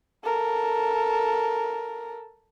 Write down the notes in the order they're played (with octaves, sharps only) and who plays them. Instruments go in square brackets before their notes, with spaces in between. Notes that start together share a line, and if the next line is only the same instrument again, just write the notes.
[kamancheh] A4 A#4